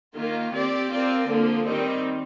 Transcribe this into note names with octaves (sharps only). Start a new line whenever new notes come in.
D#3 A#3 F4
C4 G4 D5
C4 F4 A#4 D5
D3 F3 A#3
D#3 G3 C4 D#4